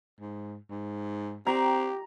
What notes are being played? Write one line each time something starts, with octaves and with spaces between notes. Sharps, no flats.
G#2
G#2
C4 G4 A#5